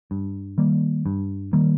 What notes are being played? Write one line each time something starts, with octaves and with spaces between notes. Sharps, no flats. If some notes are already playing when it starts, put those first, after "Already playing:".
G2
D#3 G3 A#3
G2
D#3 G3 A#3